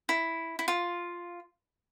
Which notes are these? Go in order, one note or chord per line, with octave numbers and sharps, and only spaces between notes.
E4
E4
F4